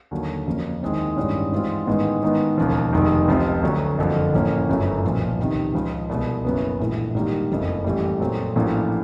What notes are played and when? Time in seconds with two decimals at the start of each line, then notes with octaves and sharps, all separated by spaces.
0.11 D#2 D3 F#3
0.46 F2 C#3 F3 A#3 C#4
0.81 D#2 D#3 G#3 C4 E4
1.17 A1 G2 D#3 G#3 C#4
1.52 G#2 E3 G#3 C4 F4
1.87 A1 G#2 D#3 G#3 B3
2.22 G#2 D#3 G#3 B3 D#4
2.58 E1 D#2 C#3 F3
2.93 F1 F2 C3 D#3 G#3
3.28 C#2 C3 F3
3.63 D2 D3 F#3
3.98 F#1 F2 D3 F3
4.34 A1 A2 F3 A#3 C#4
4.69 G1 F#2 C#3 F#3 A3
5.03 B1 A#2 F3
5.39 C#2 C3 D#3
5.74 C#2 C#3 F3 G#3
6.09 C2 B2 G#3
6.45 F#1 F#2 C#3 F#3 B3
6.80 A#1 A2 E3 G#3
7.15 G#2 D#3 G3 A#3 D#4
7.50 F#1 F2 C#3 F3 A3
7.84 A1 A2 E3 G3
8.20 A#2 F#3 A3 C4
8.56 A1 A2 F3 A#3 D4